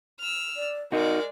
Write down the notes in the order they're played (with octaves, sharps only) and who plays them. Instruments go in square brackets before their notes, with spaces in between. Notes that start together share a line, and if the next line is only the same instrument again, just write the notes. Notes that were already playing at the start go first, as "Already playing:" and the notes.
[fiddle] E6 F6
[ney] D5
[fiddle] G#3 D5 [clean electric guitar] D#4 F#4 [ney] A#4